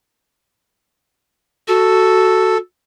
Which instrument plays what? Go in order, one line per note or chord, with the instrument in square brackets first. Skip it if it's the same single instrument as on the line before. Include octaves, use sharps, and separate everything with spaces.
[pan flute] F#4 [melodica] A4